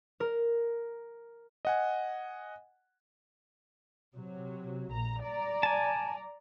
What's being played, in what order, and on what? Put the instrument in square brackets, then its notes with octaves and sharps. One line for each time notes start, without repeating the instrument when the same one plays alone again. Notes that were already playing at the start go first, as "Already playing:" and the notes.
[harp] A#4
[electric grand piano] D#5 F#5 G#5
[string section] C3 F#3
A#1 A#5
D5 A#5
[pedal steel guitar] G#5 A5